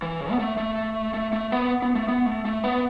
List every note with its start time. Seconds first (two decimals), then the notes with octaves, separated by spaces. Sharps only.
0.02 E3
0.21 C#3
0.31 B3
0.39 A3
0.58 A3
1.14 A3
1.33 A3
1.52 B3
1.82 B3
1.95 A3
2.08 B3
2.26 A3
2.45 A3
2.64 B3